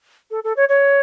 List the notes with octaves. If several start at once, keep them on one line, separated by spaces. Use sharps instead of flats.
A4
A4
C#5
C#5